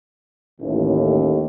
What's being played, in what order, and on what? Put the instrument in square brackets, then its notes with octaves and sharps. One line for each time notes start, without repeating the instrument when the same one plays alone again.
[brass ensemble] A1 [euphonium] D#2